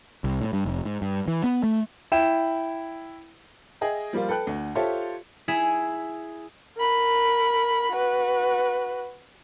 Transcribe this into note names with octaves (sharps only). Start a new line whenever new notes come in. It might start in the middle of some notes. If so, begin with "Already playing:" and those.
C2
A2
G2
F1
G#2
G2
E3
B3
A3
E4 G5 E7
G#4 D#5 E5 G5
F3 G3 A#3 F4
A4 B4 G5 F#6
D2
F4 G4 A4 C5 C#5 E5
E4 G#4 E5
A#4 B5
F#4 B4